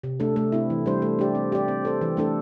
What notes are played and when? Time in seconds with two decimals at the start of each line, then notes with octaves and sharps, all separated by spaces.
0.03 C3
0.20 A3 D4 A4
0.36 A3
0.52 C4 E4
0.70 E3
0.86 G3 D4 C5
1.02 A3
1.19 D4 G4 D5
1.35 C4
1.52 G4 D5
1.68 C4
1.85 A4 C5
2.01 E3
2.17 A3 D4 A4